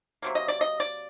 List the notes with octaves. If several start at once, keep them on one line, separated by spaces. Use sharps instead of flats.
C3 F#3 A#3
D#5
D5
D#5
D5